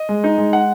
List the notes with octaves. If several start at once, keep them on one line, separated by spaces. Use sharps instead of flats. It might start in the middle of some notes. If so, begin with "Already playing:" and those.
Already playing: D#5
G#3
D#4
G#3
F#5